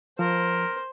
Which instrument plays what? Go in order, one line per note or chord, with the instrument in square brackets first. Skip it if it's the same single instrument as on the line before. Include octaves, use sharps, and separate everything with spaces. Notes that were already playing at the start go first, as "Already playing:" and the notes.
[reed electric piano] F3 [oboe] A#4 [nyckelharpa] C5